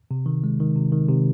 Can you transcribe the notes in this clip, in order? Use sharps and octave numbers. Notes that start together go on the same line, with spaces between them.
C3
D#3
G#3
D#3
C3
D#3
C3